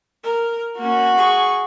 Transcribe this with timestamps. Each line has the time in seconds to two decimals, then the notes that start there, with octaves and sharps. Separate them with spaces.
0.24 A#4
0.78 A#3 C#4 F#4
1.15 G#4 C#6